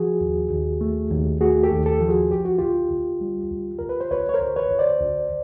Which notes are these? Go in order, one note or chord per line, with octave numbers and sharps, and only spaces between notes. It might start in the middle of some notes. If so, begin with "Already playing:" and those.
Already playing: F3 F#4 G#4
D#2
D#2
A3
D#2
A3 F#4 G#4
G4 A4
D#2
G4 A4
F3
F#4 G#4
D2 G4
F#4
D2 F4 G4
D2
G3
D2
D2 A#4
B4
C5
D2 B4 C#5
C#5
A#4 C5
D2
B4 C#5
D2
C5 D5
D2